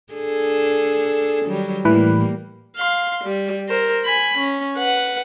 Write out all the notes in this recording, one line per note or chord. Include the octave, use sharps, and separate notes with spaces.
D4 G#4 A4
D#3 F#3 G3
A2 E3 G3 A#3 B4
F5 C6
G3
A#4 C5
G#5 B5
C#4
B4 F#5